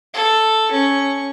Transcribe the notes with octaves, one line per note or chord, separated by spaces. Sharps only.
A4
C#4 C#6